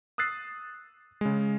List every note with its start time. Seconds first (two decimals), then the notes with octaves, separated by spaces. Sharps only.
0.18 D#6 E6 F#6 A6 C7
1.21 C#3 G#3